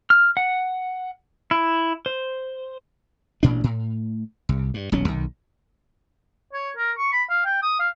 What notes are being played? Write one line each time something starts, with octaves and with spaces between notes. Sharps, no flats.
F6
F#5
E4
C5
A1 A#2 D4
A2
C2
G2
D#1 B1 F#3 C#4
B1 D#3
C#5
A#4
C#6
B5
F5
G5
D#6
F5